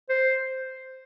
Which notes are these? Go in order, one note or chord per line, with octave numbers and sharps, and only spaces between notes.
C5